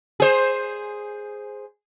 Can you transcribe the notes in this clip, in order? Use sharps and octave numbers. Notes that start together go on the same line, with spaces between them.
G#4 C5